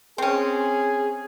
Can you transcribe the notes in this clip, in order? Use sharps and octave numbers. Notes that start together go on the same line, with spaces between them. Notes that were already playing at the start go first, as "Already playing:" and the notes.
C4 C#4 G#4